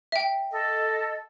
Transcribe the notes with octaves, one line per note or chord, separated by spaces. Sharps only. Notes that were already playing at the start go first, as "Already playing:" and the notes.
E5 G5
A4 D#5